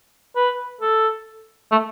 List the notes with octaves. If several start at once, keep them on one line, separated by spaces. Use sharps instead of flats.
B4
A4
A3